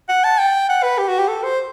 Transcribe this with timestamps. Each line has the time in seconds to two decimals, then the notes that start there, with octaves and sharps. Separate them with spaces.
0.09 F#5
0.24 A5
0.38 G5
0.69 F#5
0.83 B4
0.98 G4
1.08 F#4
1.19 G4
1.28 A4
1.43 C5